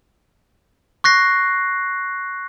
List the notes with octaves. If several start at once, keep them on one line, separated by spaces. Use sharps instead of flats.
C#6 F#6 A#6 C7